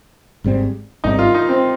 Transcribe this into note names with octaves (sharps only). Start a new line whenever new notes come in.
G#1 G#2 G3 C4
G#1 G#2 G3 C4 D#4
F4
D#4
C4